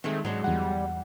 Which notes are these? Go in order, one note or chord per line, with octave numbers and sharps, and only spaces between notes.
D#3 G#3 A3 C4
G#2 F#3 G#3 D4
E2 G3 F#5